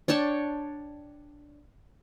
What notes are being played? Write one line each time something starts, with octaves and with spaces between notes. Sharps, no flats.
D4 C#5 G5 A5